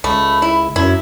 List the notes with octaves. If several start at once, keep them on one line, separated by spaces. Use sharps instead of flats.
C#2 A3 B5
E4
F#2 E4 G#6